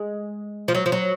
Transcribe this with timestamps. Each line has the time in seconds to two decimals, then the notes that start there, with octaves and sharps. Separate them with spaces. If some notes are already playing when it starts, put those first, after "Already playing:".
Already playing: G#3
0.68 F3
0.75 F#3
0.86 F3
0.92 F#3